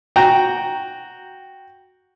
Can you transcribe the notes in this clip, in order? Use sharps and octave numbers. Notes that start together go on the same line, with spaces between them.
F#4 G5 A#5